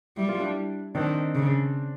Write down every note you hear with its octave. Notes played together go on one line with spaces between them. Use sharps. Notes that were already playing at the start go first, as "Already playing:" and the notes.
G3 E4
F4
D4 E4
D#3 C4 D4
C#3